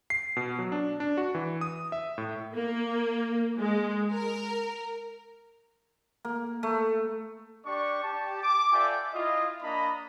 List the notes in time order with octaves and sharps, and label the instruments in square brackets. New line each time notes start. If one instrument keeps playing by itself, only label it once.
[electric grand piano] C7
B2
F#3
D4
D4
F#4
E3
D#6
E5
A2
[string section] A#3
G#3
A#4
[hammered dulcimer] A#3
A3
[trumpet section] D4 G4 D5 C#6
G4 A5
D6
F4 A4 D5 E5 G5 G#5
E4 F4 D#5
A#3 D4 D#5 A#5 B5